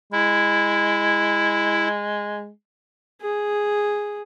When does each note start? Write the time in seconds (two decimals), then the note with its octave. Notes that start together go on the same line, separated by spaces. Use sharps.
0.12 G#3 E4
3.22 G#4